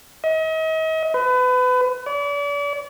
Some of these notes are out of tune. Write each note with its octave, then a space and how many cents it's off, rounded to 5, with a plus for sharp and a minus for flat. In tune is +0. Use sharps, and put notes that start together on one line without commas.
D#5 +40
B4 +30
D5 -40